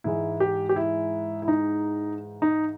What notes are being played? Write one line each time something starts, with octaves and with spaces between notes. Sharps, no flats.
G#2 E3 G#3 E4
G4
G4
E4
E4
D#4
D#4